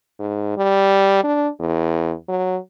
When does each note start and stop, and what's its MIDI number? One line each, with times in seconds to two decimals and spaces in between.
0.20 0.53 44
0.57 1.21 55
1.23 1.49 62
1.60 2.14 40
2.28 2.58 54